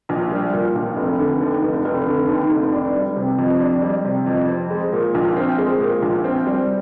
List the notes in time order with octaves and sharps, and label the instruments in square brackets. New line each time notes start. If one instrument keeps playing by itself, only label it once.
[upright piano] A#1
G3
A#2
A#1
F1
D3
D#2
F1
F1
D3
D#2
F1
D4
G3
C3
F2
D4
G3
C3
F2
C4
G#3
A#2
A#1
C4
G#3
A#2
A#1
C4
G3